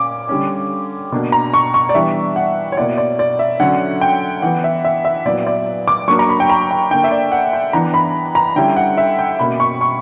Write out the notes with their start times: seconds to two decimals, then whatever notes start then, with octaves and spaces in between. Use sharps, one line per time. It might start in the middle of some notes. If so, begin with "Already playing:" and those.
Already playing: A#2 C#4 D6
0.29 D3 G3 C#4
1.12 B2 A#3 D4
1.32 A#5
1.54 C#6
1.74 C#6
1.89 D5
1.94 E3 G3 B3 D4 E5
2.36 F#5
2.72 C#5
2.77 B2 A#3 E4 D5
2.98 D5
3.19 D5
3.39 E5
3.60 D3 F#3 C#4 F#5
4.01 G5
4.42 E3 B3 E4 F#5
4.64 E5
4.85 E5
5.05 E5
5.25 A#2 F#3 B3 E4 D5
5.47 D5
5.88 D6
6.08 F#3 A#3 D4 C#6
6.19 A#5
6.29 B5
6.40 G5
6.49 A#5
6.71 G5
6.91 D3 A#3 D4 G5
7.04 E5
7.11 D5
7.32 F#5
7.53 G5
7.73 E3 B3 D4 A#5
7.94 B5
8.35 A#5
8.56 D3 G3 C#4 E4 G5
8.76 F#5
8.98 E5
9.19 G5
9.39 B2 A#3 C#4 B5
9.60 C#6
9.81 C#6